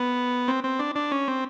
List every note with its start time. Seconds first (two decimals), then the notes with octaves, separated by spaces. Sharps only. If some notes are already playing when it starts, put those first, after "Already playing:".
Already playing: B3
0.48 C4
0.64 C4
0.79 D4
0.95 D4
1.11 C#4
1.28 C4